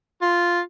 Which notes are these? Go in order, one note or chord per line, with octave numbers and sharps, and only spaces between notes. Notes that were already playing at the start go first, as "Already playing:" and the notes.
F4